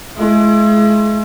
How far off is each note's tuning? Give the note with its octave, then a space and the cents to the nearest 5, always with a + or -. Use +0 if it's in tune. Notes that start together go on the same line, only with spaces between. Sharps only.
G#3 +35 E4 +35